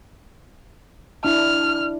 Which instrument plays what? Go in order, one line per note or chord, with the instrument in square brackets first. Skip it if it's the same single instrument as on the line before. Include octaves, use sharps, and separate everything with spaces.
[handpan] D4 E4 [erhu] F6